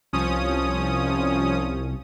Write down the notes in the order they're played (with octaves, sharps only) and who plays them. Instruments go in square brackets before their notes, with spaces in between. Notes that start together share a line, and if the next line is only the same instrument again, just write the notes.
[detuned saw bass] C2 [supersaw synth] F3 C#4 D#6